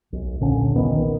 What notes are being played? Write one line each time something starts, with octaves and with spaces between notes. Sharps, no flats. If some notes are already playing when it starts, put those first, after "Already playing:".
B1
D#1 A#2 D3 C#4
A#1 D#3 B3
D#3